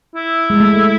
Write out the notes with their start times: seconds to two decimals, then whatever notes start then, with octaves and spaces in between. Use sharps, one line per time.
0.15 E4
0.50 G#3
0.60 A3